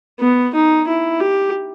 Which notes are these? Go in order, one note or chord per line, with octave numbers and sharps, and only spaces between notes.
B3
D#4
E4
G4